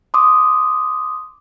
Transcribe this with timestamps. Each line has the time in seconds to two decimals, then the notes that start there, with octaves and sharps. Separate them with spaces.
0.14 C6 D6 D#6